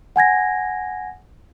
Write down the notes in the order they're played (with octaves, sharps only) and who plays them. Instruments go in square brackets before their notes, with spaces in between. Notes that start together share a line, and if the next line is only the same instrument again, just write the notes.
[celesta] F#5 G#5 G#6 A#6